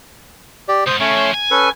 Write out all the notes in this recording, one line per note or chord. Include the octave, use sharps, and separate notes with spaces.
G4 D5
D2 G#2 C5 D#6
C#3 A3 C#4 C#5
F3 C5
G#5
C#4 A4 B4